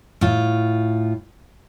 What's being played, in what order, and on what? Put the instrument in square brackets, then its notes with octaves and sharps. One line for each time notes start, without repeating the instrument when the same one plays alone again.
[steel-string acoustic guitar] A2 F4